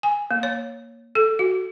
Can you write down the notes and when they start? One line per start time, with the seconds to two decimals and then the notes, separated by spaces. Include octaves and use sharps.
0.03 G#5
0.31 A#3
0.43 C#5
1.15 A4
1.39 F#4